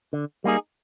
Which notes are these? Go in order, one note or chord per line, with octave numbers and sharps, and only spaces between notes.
D3
G3 A#3 D#4 G#4